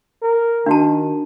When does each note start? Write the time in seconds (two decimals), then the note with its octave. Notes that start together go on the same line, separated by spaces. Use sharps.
0.22 A#4
0.66 D#3 D4 F#4 A5